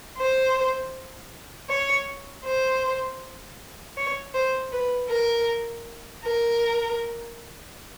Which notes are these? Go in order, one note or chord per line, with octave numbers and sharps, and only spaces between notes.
C5
C#5
C5
C#5
C5
B4
A#4
A#4